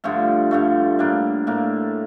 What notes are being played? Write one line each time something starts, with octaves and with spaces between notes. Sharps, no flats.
G2 D3 F3 A3
G2 D3 F3 A3
A2 G3 A#3 D4
A2 G3 A#3 D4